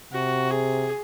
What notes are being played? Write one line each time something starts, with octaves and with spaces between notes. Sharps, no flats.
C3 F#4
G#4